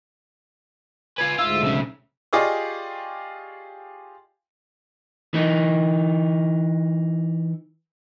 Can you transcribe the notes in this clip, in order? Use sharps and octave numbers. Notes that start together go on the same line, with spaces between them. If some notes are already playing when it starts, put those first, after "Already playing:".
F4 B4 G#5
D2 G#2 F4 E5 E6
B1 C#3
F4 G4 G#4 D5 D#5 C#6
E3 D#4